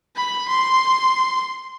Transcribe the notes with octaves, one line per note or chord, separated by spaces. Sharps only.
B5
C6